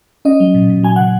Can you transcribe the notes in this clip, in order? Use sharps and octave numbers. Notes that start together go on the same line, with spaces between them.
C#4 D#5
F#3
A#2
A#2
F#3 G#5
C#3 F#5